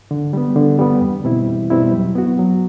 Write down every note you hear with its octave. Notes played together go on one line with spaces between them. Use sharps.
D3
G3 B3
D3
G3 B3
E2
B2 G3 C4 E4
E2
B2 G3 C4 E4
F#3
B3 F#4
F#3